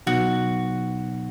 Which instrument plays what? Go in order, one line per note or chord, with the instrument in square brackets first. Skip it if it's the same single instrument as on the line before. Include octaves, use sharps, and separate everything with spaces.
[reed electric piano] B2 F#3 B3 D#4 [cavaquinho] F#4